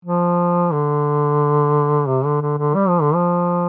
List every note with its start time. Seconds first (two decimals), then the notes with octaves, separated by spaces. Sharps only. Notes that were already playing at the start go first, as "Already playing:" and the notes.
0.05 F3
0.73 D3
2.07 C3
2.25 D3
2.42 D3
2.58 D3
2.75 G3
2.88 F3
3.02 D3
3.15 F3